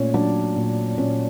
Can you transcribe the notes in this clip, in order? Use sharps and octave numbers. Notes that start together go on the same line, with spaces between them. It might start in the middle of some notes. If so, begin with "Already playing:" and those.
Already playing: A#2 A3 C#4 C#5
F#3 D4 D5
A#2
A#2 C#4 C#5